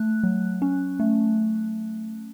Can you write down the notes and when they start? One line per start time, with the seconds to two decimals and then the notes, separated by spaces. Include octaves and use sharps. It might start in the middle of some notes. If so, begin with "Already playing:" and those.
Already playing: A3 F#6
0.23 F#3
0.62 C#4
1.00 A3